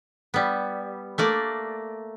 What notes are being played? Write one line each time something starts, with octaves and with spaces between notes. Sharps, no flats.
G3 B3
A3 A#3 D5